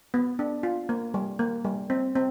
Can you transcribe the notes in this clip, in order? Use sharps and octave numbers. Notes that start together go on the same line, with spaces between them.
B3
D4
F4
A#3
G3
A#3
G3
C4
C4